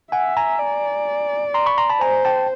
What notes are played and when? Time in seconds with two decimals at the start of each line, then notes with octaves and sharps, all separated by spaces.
0.12 E5 F#5 G#5
0.37 G#5 A#5
0.60 D5
1.54 A#5 C6
1.66 B5 C#6
1.78 A#5 C6
1.89 A5 B5
2.01 C5 G#5 A#5
2.25 G5 A5